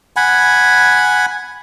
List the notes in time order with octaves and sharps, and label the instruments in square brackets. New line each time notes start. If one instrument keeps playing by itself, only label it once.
[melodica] F#5 G#5 B5